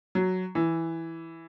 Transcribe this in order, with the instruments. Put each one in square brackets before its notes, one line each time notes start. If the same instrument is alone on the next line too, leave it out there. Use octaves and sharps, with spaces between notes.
[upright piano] F#3
E3